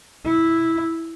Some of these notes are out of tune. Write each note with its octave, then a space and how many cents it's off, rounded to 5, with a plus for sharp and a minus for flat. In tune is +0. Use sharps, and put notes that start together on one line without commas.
E4 -5